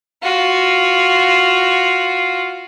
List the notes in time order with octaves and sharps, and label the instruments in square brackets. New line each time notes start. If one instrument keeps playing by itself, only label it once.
[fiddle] F4 F#4